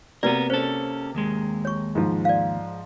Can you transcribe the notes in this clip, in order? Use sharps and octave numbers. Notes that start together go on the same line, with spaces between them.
C3 A#3 B3 F#4 A#4 B4 D5
C#4 A4 C5
D#2 G#3
C#5 C#6
G#2 F3
D5 F5